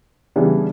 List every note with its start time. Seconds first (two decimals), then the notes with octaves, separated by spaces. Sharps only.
0.36 C#3 E3 G3 B3 D4